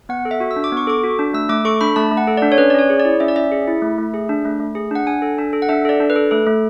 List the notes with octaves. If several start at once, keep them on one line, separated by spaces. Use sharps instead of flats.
B3 F#5
A4
E5
F#4
E6
D4
D6
B3
C#6
A4 D6
F#4
D4
A3 E6
A3 D6
A4 C#6
D4 B5
A3 A5
A3
F#5
A4
D4 D5
C#5
C#4 B4
D5
C#4 C#5
G#4
D5
E4
C#4 E5
D5
C#4 E5
G#4
E4
A3
A3
G#4
D4
A3
A3
G#4
D4 F#5
D4 G#5
A4
D4
A4
F#5
D4 E5
A4 D5
D4
B4
A4
A3 A4
A3